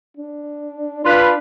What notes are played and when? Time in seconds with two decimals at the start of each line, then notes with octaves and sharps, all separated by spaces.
0.17 D4
1.05 D4 F4 B4